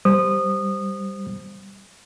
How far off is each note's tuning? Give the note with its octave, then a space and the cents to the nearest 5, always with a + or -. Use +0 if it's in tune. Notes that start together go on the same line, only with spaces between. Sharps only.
G3 +0 C5 +0 D#6 -20